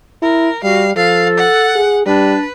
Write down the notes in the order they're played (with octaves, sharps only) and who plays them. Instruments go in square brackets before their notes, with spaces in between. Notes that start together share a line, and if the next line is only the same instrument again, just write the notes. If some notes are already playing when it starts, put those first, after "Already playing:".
[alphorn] E4 [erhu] A#4
[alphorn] G3 [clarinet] F#4 [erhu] F5
[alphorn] F3 [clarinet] A4 [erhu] F5
[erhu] F#5
[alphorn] G#4
[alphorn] G3 [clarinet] D4 [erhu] B4